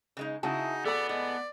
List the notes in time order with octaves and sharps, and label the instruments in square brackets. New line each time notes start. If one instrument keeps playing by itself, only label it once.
[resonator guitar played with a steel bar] C#3 G#3 D#4
[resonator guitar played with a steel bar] C#3 F#4 G#4 [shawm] D#4 [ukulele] E4 A5
[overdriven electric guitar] B3 [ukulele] A4 B5 [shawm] D5
[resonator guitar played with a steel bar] A2 G#3 [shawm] D5